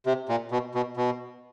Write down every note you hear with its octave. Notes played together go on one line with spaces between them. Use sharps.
C3
A#2
B2
B2
B2